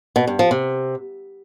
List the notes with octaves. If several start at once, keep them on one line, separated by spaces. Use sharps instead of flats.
B2
G2
F3
C3